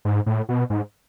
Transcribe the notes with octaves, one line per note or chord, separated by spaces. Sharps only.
G#2
A2
B2
G#2